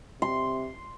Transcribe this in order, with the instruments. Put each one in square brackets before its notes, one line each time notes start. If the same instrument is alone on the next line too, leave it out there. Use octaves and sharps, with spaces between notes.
[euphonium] C3 [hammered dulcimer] C6